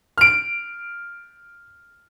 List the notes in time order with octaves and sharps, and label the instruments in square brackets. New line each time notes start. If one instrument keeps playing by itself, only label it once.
[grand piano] F6 D7